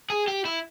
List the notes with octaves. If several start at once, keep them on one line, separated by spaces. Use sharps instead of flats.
G#4
G4
E4